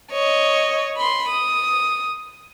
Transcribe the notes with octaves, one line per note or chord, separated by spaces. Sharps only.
C#5 D#5
B5 C6
D#6